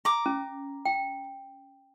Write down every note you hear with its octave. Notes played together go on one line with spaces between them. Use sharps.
A#5 D6
C#4
G5